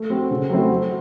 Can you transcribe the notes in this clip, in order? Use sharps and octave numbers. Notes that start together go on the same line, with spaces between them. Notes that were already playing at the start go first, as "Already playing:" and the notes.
Already playing: A3
C4 F#4
C#3
F#3 A3 C4 E4
F#3